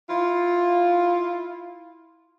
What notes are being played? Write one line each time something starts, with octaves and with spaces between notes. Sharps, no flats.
E4 F4